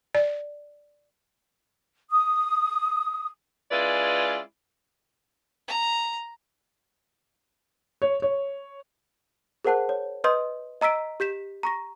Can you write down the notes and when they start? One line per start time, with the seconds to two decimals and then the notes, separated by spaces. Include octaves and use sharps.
0.15 D5
2.11 D#6
3.71 G#3 C#4 E4 F4 B4 D5
5.68 A#5
8.02 C#5
8.22 C#5
9.65 G#4 A#4 C5 F#5 A5 F#6
9.89 C#5
10.24 B4 D#5 C6 D#6 G6
10.81 D#5 A#5 E6 B6 D7
11.20 G4 G6 B6 E7
11.63 A#5 C#6 A#6